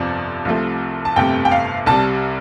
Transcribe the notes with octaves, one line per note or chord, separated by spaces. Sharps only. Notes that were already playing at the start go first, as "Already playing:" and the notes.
Already playing: G1 F2 C3 F3 D5
C2 C3 F3 A3
A5
G1 F2 C3 A3 G5
G5
F5
C2 C3 G3 A5